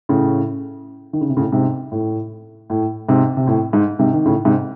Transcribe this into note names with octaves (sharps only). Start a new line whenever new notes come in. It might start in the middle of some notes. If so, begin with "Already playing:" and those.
A2 C#3
D#3
C#3
C3
A2 C#3
G#2 C3
A2
A2
G#2 C3
C3
A2
G#2
G#2 C3
D#3
A2 C#3
G#2 C3